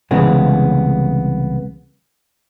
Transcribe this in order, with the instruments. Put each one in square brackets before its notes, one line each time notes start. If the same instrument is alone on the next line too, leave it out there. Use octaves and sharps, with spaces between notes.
[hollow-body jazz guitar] C2 C#3 E3 G#3 B3